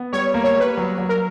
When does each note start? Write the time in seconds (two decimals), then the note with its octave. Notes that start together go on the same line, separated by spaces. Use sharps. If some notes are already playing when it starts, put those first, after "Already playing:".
Already playing: B3
0.13 G3 C#5
0.34 A#3
0.44 C#5
0.55 G3 B4
0.77 F#3
0.98 F#3
1.09 A#4